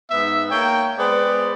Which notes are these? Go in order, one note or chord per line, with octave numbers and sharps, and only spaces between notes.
G#2 B3 E5
A#3 C#5 G5
G#3 B3 C5 D5